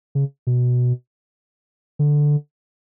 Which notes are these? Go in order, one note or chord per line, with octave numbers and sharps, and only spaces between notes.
C#3
B2
D3